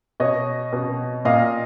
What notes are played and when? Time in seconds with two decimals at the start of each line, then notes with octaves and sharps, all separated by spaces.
0.20 B2 C#5 D#5
0.72 B2
1.25 A#2 D#5 F5